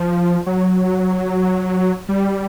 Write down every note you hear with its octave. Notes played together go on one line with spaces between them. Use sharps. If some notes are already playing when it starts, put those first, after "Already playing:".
Already playing: F3
F#3
G3